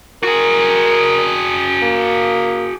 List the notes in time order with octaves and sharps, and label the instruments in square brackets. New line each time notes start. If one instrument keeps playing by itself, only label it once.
[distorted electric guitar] F#4 G#4 [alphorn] A#4
[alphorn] A#3